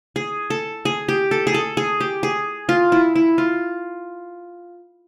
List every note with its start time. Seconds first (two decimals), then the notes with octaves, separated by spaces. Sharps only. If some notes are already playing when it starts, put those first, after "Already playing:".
0.16 G#4
0.50 A4
0.85 G#4
1.09 G4
1.31 A4
1.47 G#4
1.54 A4
1.77 G#4
2.00 G4
2.23 G#4
2.69 F4
2.92 E4
3.16 E4
3.38 F4